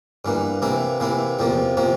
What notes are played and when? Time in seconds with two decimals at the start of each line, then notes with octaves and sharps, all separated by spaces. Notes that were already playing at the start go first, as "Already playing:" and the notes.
0.25 G2 E3 A#3
0.62 C3 E3 A#3 E4
1.00 C3 E3 A#3 E4
1.39 E2 C3 F3 A#3
1.77 C3 F3 A#3